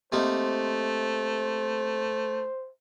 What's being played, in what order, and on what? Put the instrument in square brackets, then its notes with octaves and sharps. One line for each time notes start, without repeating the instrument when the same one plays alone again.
[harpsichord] C3 A#3 D#4 [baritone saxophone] A3 [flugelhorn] C5